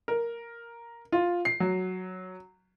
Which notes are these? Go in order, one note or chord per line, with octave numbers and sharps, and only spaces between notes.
A#4
F4
C7
F#3